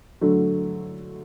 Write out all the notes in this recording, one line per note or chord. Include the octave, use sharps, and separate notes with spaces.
D3 F#3 A3